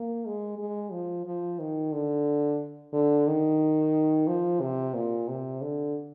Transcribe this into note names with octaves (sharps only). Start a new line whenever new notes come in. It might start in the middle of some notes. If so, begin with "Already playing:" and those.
Already playing: A#3
G#3
G#3
F3
F3
D#3
D3
D3
D#3
F3
C3
A#2
C3
D3